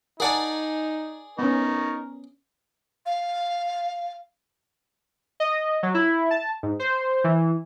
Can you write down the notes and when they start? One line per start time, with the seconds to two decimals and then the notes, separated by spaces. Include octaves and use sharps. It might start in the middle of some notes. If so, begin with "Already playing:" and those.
0.20 D#4 G#4 A#4 D5 F#5 G#5 A5
1.39 B3 C#4 D#4 A#4 C#6
3.06 F5
5.40 D#5
5.83 F#3
5.94 E4
6.31 A5
6.63 G#2
6.80 C5
7.24 E3